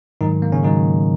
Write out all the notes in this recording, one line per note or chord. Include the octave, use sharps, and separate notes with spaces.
G#2 D#3 F#3 D#4
A#3
C#3 C#4
G#2 D#3 F#3 D#4